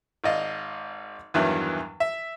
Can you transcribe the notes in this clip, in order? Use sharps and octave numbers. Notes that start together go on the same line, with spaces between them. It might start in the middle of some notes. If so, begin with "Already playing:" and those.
G#1 D5 D#5 F5
E2 G2 D#3 E3 F#3
E5